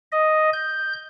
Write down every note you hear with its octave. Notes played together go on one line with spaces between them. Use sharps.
D#5
G6